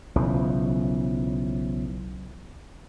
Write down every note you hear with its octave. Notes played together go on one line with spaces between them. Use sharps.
B1 C#3 E3 F3